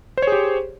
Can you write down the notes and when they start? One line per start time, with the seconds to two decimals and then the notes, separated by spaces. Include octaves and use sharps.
0.18 C5
0.22 C#5
0.27 G#4
0.32 G4